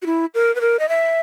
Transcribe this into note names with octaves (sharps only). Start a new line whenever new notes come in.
F#4
E4
A#4
B4
A#4
D#5
E5